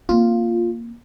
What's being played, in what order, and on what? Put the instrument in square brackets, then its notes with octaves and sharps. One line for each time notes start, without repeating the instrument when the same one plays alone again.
[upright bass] A#3 C4 [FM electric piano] F4